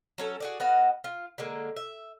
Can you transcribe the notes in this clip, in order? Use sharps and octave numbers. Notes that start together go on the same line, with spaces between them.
F#3 C#4 A4
F#4 G#4 D5
B3 F#4 D#5 F5
F4
D3 G#3 A#3
E5